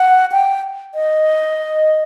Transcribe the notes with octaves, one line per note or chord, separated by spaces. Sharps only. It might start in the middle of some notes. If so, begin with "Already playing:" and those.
Already playing: F#5
G5
D#5